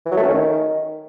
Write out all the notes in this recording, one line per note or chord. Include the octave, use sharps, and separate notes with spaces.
E3
F#3
A3
C#4
D#3